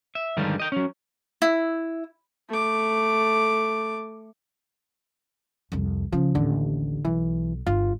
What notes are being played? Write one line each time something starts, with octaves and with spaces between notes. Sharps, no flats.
E5
G2 D3 D#3 F3 G3 G#3
D#5 G5
F#3 C#4
E4
A3 D6
C2 F2
C#3 F3
A1 D#2 D3
B1 E3
G1 F4